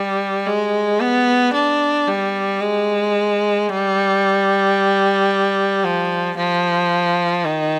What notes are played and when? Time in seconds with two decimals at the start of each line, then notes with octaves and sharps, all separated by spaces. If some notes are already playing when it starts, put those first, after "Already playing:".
Already playing: G3
0.46 G#3
1.00 B3
1.54 D4
2.07 G3
2.61 G#3
3.69 G3
5.84 F3
6.38 F3
7.45 D#3